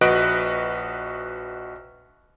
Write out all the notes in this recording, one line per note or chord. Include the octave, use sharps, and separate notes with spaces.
A#1 F#4 B4 D#5 F#6 D7